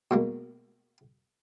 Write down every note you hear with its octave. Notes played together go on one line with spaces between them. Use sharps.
B2 G#3 A#3